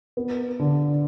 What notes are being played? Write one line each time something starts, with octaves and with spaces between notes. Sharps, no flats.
B3
D3